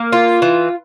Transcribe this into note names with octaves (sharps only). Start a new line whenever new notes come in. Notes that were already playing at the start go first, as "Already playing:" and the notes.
Already playing: A#3
F4
E3